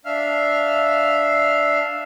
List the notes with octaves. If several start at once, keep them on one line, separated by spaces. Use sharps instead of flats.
D4 E5 F5 F6